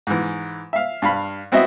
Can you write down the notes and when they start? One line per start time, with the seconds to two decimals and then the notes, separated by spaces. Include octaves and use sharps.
0.07 G#2 E3
0.73 E5 F5
1.02 G2 F5 B5
1.52 B3 C4 E4 F#4 D#5 E5